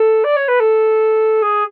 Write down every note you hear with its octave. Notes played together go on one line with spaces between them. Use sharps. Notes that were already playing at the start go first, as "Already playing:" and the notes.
Already playing: A4
D5
C#5
B4
A4
G#4